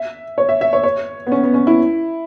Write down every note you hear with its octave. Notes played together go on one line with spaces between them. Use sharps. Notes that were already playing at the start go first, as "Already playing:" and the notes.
Already playing: E5
C#5
E5
E5
C#5
C#5
B3
C#4
B3
C#4
E4